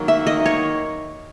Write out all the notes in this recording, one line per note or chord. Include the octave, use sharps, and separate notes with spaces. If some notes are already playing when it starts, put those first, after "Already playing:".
Already playing: D#3 F#3 A#3
E5
D#5
C#5